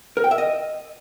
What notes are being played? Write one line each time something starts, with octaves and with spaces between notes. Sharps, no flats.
A#4
G5
E5
D#5